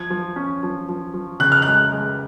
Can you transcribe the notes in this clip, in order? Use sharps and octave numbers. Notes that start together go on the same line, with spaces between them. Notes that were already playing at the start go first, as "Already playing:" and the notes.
Already playing: F3 G#6
F3
C#4
F3
F3
F3
C#3 F#6
F6
G#3 F#6
G#3